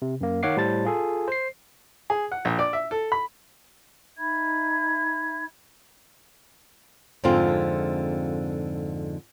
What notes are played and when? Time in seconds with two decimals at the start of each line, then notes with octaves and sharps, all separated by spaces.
0.02 C3
0.21 F#2 A#3
0.43 D#3 C#5 F5 F#5 D6 C7
0.57 A2 G3 C5 A5 A6
0.85 F4 G#4 A4
1.28 C5 C7
2.10 G#4
2.32 F#5
2.45 A#1
2.59 D5
2.73 E5
2.91 A4
3.12 B5
4.18 D#4 E5 B5 G#6
7.24 F2 G#2 D3 C4 F4